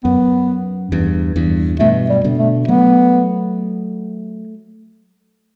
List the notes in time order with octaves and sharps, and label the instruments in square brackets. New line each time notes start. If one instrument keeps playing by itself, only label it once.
[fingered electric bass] F#2 [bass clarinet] B3
[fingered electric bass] E2 G2
E2 G2
[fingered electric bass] G2 B2 [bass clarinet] A3
[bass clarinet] G3
[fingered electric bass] B2 D3
[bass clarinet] A3
[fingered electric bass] F#3 A3 [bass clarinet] B3